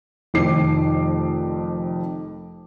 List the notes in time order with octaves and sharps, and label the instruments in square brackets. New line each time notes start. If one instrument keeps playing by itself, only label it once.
[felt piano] F1 F2 D#3 D6 C7